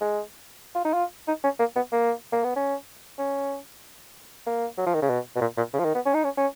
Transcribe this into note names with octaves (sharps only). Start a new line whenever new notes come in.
G#3
F4
D#4
F4
D#4
C#4
A#3
B3
A#3
A#3
B3
C#4
C#4
A#3
F#3
F3
D#3
C#3
B2
B2
A#2
A#2
C#3
F3
D#3
B3
C#4
D#4
C#4
C#4